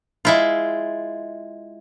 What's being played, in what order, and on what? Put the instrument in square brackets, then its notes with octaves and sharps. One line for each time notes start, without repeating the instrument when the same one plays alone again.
[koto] G#3 E4 F4